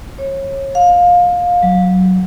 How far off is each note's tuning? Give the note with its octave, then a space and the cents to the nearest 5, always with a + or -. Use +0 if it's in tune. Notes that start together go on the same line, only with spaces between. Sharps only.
C#5 -25
F5 +20
F#3 +5